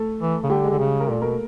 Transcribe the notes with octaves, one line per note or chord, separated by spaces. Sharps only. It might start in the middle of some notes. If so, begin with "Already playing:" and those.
Already playing: A3 A4
E3
C#3
D3 G3 G4
G#3 G#4
D3
C#3
A#4
A#2 A3 A4
B2 A#3 A#4